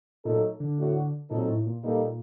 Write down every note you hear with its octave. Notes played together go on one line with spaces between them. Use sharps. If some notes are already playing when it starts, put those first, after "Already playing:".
A#2 F#3 A3 D#4 A4
D3
A2 A3 D4 F#4
A#2 F#3 C4 D#4 A4
A2
A#2
A#2 G3 A#3 D#4 A4